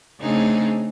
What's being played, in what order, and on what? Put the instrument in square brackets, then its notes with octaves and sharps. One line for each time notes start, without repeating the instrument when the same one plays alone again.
[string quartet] C#3 A3 C4 D4 D#4 G#4